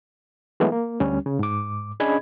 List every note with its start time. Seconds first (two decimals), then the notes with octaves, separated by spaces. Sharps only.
0.60 E3 F#3 G#3 A3 B3
0.72 A#3
1.00 D2 G3 C#4
1.26 C#3
1.39 G#2 D6
2.00 C#4 D4 G#4 D#5 B5 G#6